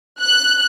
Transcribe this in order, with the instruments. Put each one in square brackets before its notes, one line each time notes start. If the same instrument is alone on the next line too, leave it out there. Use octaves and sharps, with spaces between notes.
[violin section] F#6